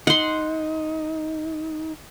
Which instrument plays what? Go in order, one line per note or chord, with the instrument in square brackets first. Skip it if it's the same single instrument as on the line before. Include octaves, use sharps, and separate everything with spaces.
[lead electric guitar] D#4 [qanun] F#5 C6